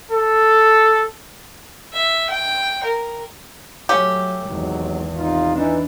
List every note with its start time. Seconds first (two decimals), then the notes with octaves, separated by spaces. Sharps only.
0.12 A4
1.92 E5
2.30 G5
2.84 A#4
3.89 F#3 A3 C#4 G4
4.46 G#1 E2 G#2 C3 F#3
5.17 C3 D#4 F4
5.56 E3 D4 D#4